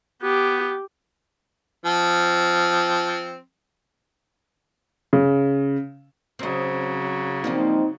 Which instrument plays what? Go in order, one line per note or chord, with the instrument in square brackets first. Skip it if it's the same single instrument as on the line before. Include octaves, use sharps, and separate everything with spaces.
[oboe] B3 [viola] G4
[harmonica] F3 C4
[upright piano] C#3
[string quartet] C#3 F#3 [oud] C4 D#5
[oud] F3 G3 A#3 [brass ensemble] C4 D#4